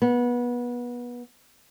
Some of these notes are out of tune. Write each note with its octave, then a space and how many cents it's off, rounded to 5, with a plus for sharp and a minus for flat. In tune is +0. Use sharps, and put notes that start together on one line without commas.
B3 -25